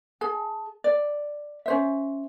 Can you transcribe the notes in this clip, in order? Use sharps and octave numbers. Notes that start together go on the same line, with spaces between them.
G#4 A5
D5
C#4 C5 E5